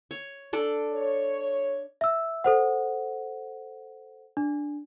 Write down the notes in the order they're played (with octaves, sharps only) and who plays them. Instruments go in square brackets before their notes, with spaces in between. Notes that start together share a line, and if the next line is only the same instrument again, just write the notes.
[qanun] C#5
D4 A4 D5
[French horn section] C#5
[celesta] E5 E6
A4 C5 F#5
D4